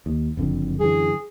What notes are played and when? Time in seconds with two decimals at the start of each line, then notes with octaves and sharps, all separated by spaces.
0.06 D#2
0.37 F#1 F2 D3
0.80 F#2 D3 E3 G#4